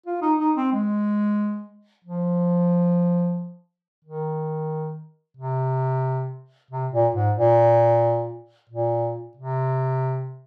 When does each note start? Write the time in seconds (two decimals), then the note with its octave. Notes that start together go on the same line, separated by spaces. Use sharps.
0.06 F4
0.22 D#4
0.39 D#4
0.56 C4
0.73 G#3
2.05 F3
4.05 D#3
5.37 C3
6.71 C3
6.92 A#2
7.15 G#2
7.37 A#2
8.70 A#2
9.37 C3